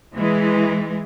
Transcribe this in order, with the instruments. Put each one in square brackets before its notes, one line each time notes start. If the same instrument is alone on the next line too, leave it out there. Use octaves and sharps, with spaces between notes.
[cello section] E3 G#3